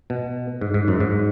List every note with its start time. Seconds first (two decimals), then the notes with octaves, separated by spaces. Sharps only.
0.10 B2
0.61 G#2
0.74 G#2
0.88 F#2
1.00 G#2